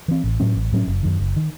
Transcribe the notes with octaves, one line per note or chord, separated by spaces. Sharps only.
E3 C4
A1
A2 F#3 C#4
A1
A2 F#3 C#4
F#1
F#2 D#3
F#1
D#3